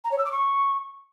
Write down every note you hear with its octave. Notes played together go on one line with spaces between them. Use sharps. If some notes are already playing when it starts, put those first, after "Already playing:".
A#5
C#5
E6
D6
C#6